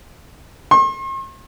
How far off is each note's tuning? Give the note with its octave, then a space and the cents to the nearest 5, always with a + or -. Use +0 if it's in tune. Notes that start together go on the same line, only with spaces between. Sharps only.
C6 +45